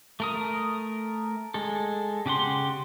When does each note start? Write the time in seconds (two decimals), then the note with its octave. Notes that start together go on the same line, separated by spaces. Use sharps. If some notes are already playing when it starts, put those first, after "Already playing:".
0.20 A3 A#4 D#6
1.54 G#3 A4
2.26 C#3 G4 F#5 C6